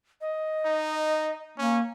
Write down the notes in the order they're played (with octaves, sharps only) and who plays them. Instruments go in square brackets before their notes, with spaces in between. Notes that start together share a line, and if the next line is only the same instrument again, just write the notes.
[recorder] D#5
[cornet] D#4
[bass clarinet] A#3 [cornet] C#4